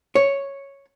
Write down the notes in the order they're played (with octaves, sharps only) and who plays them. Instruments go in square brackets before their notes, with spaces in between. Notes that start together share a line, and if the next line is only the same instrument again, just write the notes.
[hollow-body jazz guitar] C#5